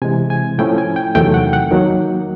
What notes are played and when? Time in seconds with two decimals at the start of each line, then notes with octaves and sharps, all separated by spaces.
0.02 C3 E3 G#3 G#5
0.30 G#5
0.58 A2 F3 A3 C#4 E4 G5
0.78 G#5
0.96 G5
1.15 E2 C3 D#3 F#3 A3 G5
1.34 F#5
1.47 G5
1.53 F#5
1.71 D#3 F#3 A#3